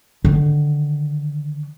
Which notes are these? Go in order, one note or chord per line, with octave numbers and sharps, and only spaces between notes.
D3 D#3